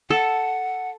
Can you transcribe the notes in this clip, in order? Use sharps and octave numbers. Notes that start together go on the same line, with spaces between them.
A4 F#5